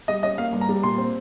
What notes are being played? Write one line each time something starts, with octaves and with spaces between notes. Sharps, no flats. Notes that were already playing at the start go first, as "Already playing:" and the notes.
G3 D#5
C#4 D#5
A#3 F5
G2
A#5
G3
A#2 C6
C4